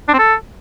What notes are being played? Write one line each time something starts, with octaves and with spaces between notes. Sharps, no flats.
D4
C4
A4